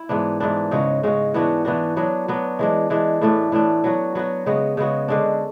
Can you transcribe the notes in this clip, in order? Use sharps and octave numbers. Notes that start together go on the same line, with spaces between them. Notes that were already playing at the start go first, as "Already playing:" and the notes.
Already playing: E4
G#2 E3 B3 D4
G#2 E3 B3 D4
C#3 G#3 C#4 F#4
C#3 G#3 C#4 F#4
E3 B3 D4 F#4
E3 B3 D4 F#4
F#3 B3 D4
F#3 B3 D4
E3 G#3 D4
E3 G#3 D4
A2 E3 A3 D4
A2 E3 A3 D4
F#3 B3 F#4
F#3 B3 F#4
C#3 G#3 B3 F#4
C#3 G#3 B3 F#4
D3 G#3 D4